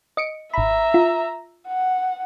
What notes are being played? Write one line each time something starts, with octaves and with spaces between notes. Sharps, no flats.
D#5 C#7 D7
G#1 E5 A#5 B5
F4
F#5